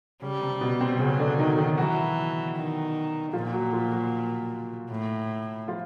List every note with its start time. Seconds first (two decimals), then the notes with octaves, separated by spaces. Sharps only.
0.22 C#3 G3 C#4
0.41 C3 C4
0.61 B2 B3
0.81 C3 C4
0.99 C#3 F#3 C#4
1.19 D3 D4
1.38 D#3 D#4
1.58 D#3 D#4
1.77 E3 F#3 F#4
2.56 D#3
3.33 A#2 F3 F4
3.53 F#3 F#4
3.73 F3 F4
3.92 F#3 F#4
4.90 A2
5.68 F3 F4